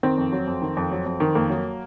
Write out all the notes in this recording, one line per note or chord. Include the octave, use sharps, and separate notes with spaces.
D#3 C4
F2
F#3
F2
D#3
F2
F#3
F2
D#3
F2 A#3
F#3